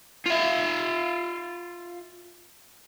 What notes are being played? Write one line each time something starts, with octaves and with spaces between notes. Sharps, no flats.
F4 E5